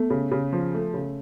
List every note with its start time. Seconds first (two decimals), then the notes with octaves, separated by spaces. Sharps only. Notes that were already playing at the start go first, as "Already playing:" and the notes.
Already playing: A3 B3
0.10 C#3
0.32 C#3
0.53 F3
0.74 A3
0.94 C#3